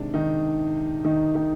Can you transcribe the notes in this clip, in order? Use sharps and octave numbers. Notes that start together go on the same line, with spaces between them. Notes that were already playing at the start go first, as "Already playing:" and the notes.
Already playing: C3 D#3 G#3 D4
D#3 D#4
D#3 D#4
D#3 D#4